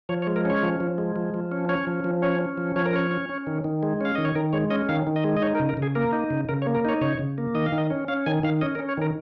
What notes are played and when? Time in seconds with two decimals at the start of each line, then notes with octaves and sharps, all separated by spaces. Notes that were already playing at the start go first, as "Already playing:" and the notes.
0.09 F3 C#5
0.22 C#5
0.27 G#3
0.36 A#4
0.45 C#4 C#5
0.63 F3
0.80 F3
0.98 G#3
1.16 F3
1.34 F3
1.52 C#4
1.69 C#4 C#5
1.87 F3
2.04 F3
2.22 C#4 C#5
2.41 C#4
2.58 F3
2.76 F3 C#5
2.85 A#4
2.93 C#4 C#5
3.11 C#4
3.29 C#4
3.47 D#3
3.64 D#3
3.83 G#3
4.01 C#4 F5
4.15 D#3 D#5
4.25 C#5
4.35 D#3 A#4
4.53 G#3 C#5
4.70 C#4 D#5
4.89 D#3 F5
5.07 D#3
5.16 D#5
5.24 G#3
5.37 D#5
5.42 D#4 C#5
5.55 A#4
5.60 C#3
5.69 A#4
5.77 C#3
5.82 G#4
5.95 A#3 A#4
6.13 D#4
6.31 C#3
6.49 C#3 A#4
6.62 C#5
6.66 A#3
6.75 A#4
6.85 D#4 C#5
7.01 C#3 C#5
7.19 C#3
7.38 A#3
7.55 D#3 D#5
7.66 F5
7.72 D#3
7.78 D#5
7.90 C#4
8.08 C#4 F5
8.26 D#3 G#5
8.43 D#3 F5
8.61 C#4 D#5
8.75 A#4
8.79 C#4
8.89 C#5
8.97 D#3 A#4